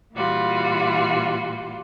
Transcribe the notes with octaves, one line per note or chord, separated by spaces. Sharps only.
A#2 E3 G3 F4 F#4